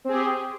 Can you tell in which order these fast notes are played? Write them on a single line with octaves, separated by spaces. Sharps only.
C4 G#4 G4